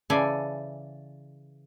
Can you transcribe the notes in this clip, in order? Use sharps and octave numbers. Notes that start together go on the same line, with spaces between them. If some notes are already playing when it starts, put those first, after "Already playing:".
C#3 E3 A4 D5 G#5